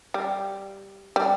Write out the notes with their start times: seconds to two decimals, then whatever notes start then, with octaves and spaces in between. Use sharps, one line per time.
0.14 G3
1.16 G3